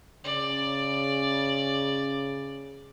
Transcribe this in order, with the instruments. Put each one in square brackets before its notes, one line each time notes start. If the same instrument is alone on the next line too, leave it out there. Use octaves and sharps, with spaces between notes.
[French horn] C#3 [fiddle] D5